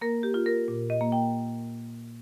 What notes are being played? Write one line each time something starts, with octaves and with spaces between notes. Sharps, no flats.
A#3 A#4
G4
F4
A#4
A#2
D#5
A#3
G5